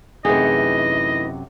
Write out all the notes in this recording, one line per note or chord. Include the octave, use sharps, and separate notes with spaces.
F#2 C3 E3 A3 D#4 G#4 D#5